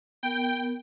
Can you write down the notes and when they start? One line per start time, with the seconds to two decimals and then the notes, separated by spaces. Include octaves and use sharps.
0.23 B3 A#4 G5